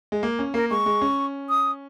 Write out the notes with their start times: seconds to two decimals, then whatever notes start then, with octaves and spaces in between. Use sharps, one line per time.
0.12 G#3
0.23 A#3
0.39 C#4
0.54 A#3 A#4
0.70 G#3 C#6
0.86 G#3
1.02 C#4
1.49 D#6